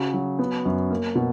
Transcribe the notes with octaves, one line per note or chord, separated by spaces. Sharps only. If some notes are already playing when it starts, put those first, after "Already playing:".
Already playing: C#3 F#4
F#3
B3
F#2
A#3
B2